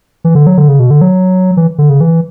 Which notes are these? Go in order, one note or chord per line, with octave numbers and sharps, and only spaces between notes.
E3
D3
F#3
D3
C#3
B2
D3
F#3
E3
D3
C#3
E3